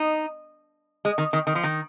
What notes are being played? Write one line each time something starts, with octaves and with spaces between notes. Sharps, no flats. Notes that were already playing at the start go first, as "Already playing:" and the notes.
Already playing: D#4
G#3
D#3
D#3
D#3
F3
D#3